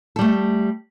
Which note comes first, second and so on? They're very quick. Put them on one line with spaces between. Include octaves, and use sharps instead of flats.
A4 G3 A3